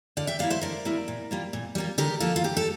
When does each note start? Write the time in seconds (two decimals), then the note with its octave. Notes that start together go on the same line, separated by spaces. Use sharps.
0.17 D3 D5 F5
0.27 E5 G5
0.39 G3 A#3 E4 D5 F5
0.50 C5 E5
0.61 D3 A#4 D5
0.85 G3 A#3 E4
1.08 A#2
1.31 G3 A#3 F4
1.53 A#2
1.75 G3 A#3 F4
1.98 D3 G4 A#4
2.20 F3 A#3 F4 A4
2.36 F4
2.44 D3 G4
2.57 A4